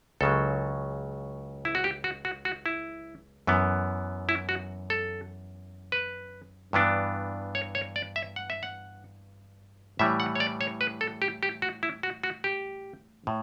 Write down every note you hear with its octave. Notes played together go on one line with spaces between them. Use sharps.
C#2 C#3 F#3 A4
E4
F#4
G4
F#4
F#4
F#4
E4
F#2 E3 B3
E4
F#4
A4
B4
G2 E3 B3 D4
C#5
C#5
D5
E5
F#5
E5
F#5
A2 E3 G3 E5
F#5
C#5
D5
C#5
B4
A4
G4
G4
F#4
E4
F#4
F#4
G4
A2